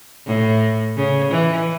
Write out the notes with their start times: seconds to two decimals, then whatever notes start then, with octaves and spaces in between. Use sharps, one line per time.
0.27 A2
0.97 C#3
1.32 E3